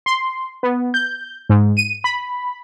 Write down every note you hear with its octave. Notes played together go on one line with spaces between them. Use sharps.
C6
B3
G6
G#2
D#7
B5